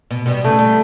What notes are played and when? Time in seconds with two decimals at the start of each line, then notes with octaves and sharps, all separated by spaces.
0.11 B2
0.26 B2 G3
0.44 C#3 A3
0.59 G3